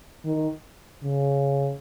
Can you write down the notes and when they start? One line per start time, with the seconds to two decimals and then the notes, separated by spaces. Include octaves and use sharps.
0.25 D#3
1.03 C#3